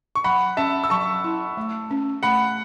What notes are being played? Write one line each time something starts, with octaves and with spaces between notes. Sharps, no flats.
C#6
F#3 F#5 B5
C#4 E5 A5
E6
F#3 A5 C#6
E4
A3
C#4
A3 F#5 B5